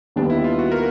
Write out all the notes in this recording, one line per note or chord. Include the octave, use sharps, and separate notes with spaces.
D#2 D#3 G3 B3 D4
E4
F4
F#4
A#4